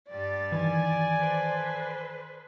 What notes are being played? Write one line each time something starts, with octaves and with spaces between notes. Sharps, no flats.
G2 G3 D5 A6
D#3 E3 G#5
A4 B4 C5